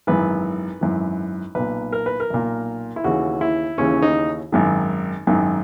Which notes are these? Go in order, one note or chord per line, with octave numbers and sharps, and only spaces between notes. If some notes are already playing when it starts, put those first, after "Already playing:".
G#1 F#2 E3 B4
G#1 F#2 E3
B1 A#2 B4
A#4
B4
A#4
B1 A#2
E4
D#2 C#3 E3 F#4
E4
D#2 C#3 E3 C#4
D#4
G#1 F#2 D#3
G#1 F#2 D#3